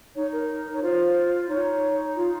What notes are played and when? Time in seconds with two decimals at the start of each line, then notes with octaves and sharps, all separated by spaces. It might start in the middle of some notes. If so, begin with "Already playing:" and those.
0.15 D#4 C#5
0.32 A#4
0.74 C#5
0.82 F4 C5
1.49 D#4 C#5
2.16 F4